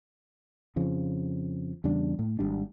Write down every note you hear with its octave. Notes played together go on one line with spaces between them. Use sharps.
F2 C#3 F3
E2 C#3 G3 D4
A2
G#1 G3 D4